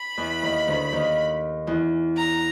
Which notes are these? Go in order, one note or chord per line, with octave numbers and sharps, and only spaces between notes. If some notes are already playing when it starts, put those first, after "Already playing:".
Already playing: B5
E2 E3
D#2 D#3
D2 D3
D#2 D#3
E2 E3
A#5